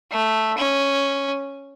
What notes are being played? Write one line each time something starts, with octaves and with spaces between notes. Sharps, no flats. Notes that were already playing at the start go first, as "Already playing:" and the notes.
A3
C#4